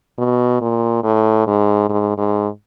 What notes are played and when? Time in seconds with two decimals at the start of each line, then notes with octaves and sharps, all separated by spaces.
0.18 B2
0.61 A#2
1.04 A2
1.47 G#2
1.89 G#2
2.18 G#2